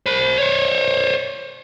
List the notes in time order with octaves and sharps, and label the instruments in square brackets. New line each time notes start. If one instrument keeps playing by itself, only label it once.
[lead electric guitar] C5 B5
C5 C#5